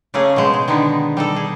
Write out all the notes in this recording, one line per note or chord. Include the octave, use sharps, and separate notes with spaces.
C#3 A3 A#3 C#4 G#4
B2 G#3 C5
G#4
D3 D#3 B3 D#4
G3 D#4 A4
G#4